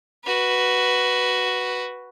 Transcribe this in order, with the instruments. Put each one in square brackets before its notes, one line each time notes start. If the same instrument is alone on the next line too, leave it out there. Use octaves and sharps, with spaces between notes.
[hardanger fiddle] F#4 B4